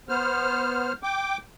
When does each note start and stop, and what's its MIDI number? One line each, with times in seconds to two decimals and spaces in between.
0.09 0.93 59
0.09 0.93 72
0.09 0.93 89
1.03 1.37 79
1.03 1.37 86